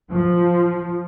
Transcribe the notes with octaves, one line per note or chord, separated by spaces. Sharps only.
F3